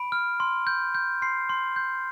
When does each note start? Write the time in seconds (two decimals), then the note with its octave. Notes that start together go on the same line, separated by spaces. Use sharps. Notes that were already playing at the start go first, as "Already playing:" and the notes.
Already playing: B5 D7
0.12 F6
0.40 C6
0.67 G6
0.95 G6
1.22 C6 C7
1.49 C6
1.76 G6